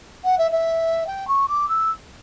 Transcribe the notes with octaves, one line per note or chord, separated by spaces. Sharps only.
F#5
E5
E5
G5
C#6
D6
E6